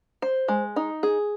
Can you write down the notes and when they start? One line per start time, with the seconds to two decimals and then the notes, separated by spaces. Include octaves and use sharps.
0.22 C5
0.48 G#3
0.76 D#4
1.03 G#4